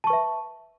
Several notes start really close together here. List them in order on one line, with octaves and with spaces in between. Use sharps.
A5 C#6 B4 E5